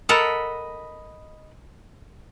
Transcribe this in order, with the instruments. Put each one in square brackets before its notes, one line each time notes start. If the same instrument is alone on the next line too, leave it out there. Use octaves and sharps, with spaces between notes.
[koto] A4 A#4 F#5 [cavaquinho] D#5 B5